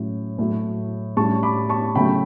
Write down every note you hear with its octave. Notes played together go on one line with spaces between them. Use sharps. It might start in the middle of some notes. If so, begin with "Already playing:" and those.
Already playing: A2 F#3 C#4
A2 F#3 A3
A2 G3 C#4 A5 C#6
B5 D6
A5 C#6
C#3 F#3 A3 G5 B5